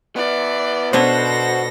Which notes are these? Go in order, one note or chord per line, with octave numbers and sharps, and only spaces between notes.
B3 E4 D5
B2 B3 D4 E4 F#4 A4 C5 A#6